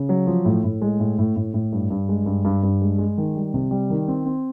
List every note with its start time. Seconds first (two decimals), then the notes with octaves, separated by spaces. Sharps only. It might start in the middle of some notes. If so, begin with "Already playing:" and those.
Already playing: C#3
0.09 F#3
0.27 F3
0.45 A2
0.64 A2
0.82 G#3
1.00 A2
1.19 A2
1.36 A2
1.54 A2
1.73 G2
1.90 G2
2.09 G#3
2.26 G2
2.45 G2
2.63 G2
2.81 G#3
2.98 G#3
3.18 D#3
3.36 G3
3.54 C3
3.71 G3
3.90 D#3
4.08 C4
4.26 C4